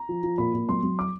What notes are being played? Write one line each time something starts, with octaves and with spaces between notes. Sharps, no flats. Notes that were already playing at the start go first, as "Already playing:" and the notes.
Already playing: A#5
F3
F3
A#2 B5
A#2
F#3 C6
F#3
D6